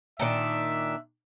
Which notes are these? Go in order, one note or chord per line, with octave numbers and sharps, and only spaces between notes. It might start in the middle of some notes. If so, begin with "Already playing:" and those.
A#2 D#3 D4 E5